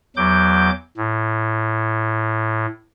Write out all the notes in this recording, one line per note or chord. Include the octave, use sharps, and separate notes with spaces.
E2 F#3 D6 G6
A2